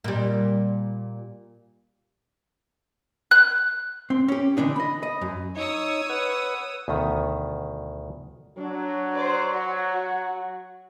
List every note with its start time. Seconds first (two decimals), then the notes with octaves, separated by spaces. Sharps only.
0.04 A#2 G3
3.31 F#6
4.10 C4
4.28 C#4 G4
4.57 D3 E3 D4 D#4
4.76 D#5 B5
5.03 D#5
5.21 F#2
5.57 D#4 C#5 D#6 E6
6.09 B4 F#5
6.88 D2 B2 D#3
8.57 F#3 D4
9.15 C5 D5
9.54 F#4